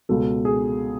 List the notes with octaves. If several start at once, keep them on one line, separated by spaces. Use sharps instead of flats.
C#2 B2 A4
G#4